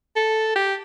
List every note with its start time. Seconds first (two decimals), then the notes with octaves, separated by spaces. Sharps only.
0.16 A4
0.56 G4